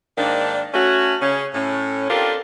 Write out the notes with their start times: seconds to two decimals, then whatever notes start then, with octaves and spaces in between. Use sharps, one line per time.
0.18 G#2 D#3 A#3 D4
0.74 A3 C#4 F#4
1.22 C#3 C#4
1.54 A2 C#4
2.10 C4 D4 F4 G4 A4 A#4